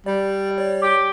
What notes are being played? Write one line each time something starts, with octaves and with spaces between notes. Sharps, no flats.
G3 D5
C#5 D5
G4